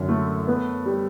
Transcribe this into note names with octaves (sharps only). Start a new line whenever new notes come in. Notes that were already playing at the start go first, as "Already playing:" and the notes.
Already playing: F#2 D3
A3
B3
G3